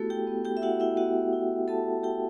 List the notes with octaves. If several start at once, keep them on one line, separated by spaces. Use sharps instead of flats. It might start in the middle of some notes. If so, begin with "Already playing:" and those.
Already playing: A3 B3 E4 F#4 G4 A4
G4 G5
B3
G4 G5
E5
E4 F#4 F#5
E4 E5
B3 F#4 F#5
E4
B3 A4 A5
E4 G4 G5